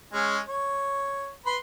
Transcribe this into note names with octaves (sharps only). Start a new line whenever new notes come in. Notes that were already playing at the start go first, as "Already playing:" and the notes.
G#3 C#4
C#5
B4 B5 C6